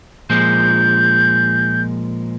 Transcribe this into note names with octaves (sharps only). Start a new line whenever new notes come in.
A#2 F3 G#3 G6